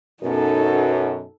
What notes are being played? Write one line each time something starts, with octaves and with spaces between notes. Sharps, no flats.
F#2 B2 D#4 A4